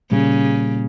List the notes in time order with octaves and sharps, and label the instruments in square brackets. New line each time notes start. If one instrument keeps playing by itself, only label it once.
[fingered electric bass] A#2 G3 [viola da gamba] C#3